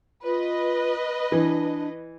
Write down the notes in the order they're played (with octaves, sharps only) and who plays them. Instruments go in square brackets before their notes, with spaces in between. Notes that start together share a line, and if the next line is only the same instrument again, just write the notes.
[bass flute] F4 [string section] B4 D#5
[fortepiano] E3 [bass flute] D4